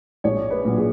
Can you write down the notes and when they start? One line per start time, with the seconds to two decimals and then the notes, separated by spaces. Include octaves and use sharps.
0.24 A#1 C#5
0.51 B4
0.65 A#2 F#3
0.77 G#4